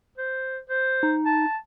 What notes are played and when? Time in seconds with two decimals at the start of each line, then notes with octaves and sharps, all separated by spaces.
0.18 C5
0.70 C5
1.03 D#4
1.26 A5